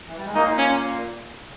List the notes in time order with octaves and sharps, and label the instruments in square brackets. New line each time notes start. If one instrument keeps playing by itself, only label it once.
[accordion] E3
G3
G#3
[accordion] A#2 A#3 [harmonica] D#4
[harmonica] C#4